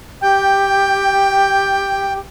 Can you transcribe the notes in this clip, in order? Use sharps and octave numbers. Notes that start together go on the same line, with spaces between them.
G4 G5